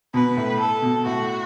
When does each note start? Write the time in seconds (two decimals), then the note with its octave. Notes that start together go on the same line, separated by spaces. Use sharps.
0.14 B2 B4
0.37 A2
0.60 A4
0.82 B2
1.06 A2 F#4